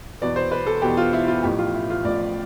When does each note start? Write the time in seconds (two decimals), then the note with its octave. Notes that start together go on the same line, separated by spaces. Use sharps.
0.22 E2 B2 B3 D5
0.36 C5
0.52 B4
0.67 A4
0.82 E2 B2 B3 G4
0.97 F4
1.13 E4
1.28 F4
1.43 A1 A2 F3 G4
1.59 F4
1.74 E4
1.90 F4
2.05 A1 A2 F3 D5